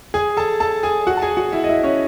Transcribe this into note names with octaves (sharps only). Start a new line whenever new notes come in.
G#4 G#5
A4 A5
A4 A5
G#4 G#5
F#4 F#5
A5
G#4 G#5
F#4 F#5
E4 E5
D#5
E4 E5
C#4 C#5